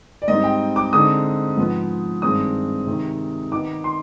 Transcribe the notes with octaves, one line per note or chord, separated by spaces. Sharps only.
D5
G#2 G3 C4 D#4 D#5
G5
D6
D3 G#3 C4 D#4 D#6
G#2 F3 B3
G2 D#3 G#3 C4 D#6
C3 D#3 G#3
D#3 B3 D#4 D6
C6